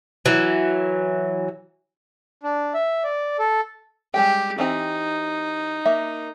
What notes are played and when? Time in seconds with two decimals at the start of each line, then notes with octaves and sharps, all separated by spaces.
0.26 E3 F#3
2.43 D4
2.74 E5
3.04 D5
3.39 A4
4.14 G3 G#3 G4 G5
4.58 E3 C4 D#4 G4
5.85 A#3 E5